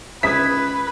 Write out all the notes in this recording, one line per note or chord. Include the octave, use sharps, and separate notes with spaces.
C#2 B4 E5 D#6 G#6 B6